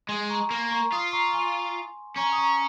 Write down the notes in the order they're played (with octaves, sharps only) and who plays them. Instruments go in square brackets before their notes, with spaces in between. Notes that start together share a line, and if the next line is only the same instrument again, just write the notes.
[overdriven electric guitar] G#3 [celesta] G#5 C6
[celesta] A#5 C#6
[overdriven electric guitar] A#3
[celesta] A#5 C#6
[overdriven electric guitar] F4 [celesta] C6 D#6
[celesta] A#5 C#6
C#6
G#5 C6
[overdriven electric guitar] C#4 [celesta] A#5 C#6
[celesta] D#6
A#5 C#6